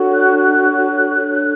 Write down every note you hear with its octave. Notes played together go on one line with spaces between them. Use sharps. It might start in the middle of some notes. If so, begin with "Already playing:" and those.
Already playing: D4 F#4 A4 C#5
F#6
F#6
D4 A4 C#5